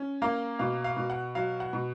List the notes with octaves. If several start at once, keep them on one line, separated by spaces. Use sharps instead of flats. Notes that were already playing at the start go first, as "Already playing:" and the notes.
Already playing: C#4
A#3 F5
B2 F5
F5
B2
F#5
F#3 F5
F#5
B2